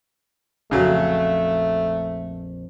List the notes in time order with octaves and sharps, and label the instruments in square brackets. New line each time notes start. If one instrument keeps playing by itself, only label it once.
[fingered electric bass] A#1 F2 [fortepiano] C#3 F#3 [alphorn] A3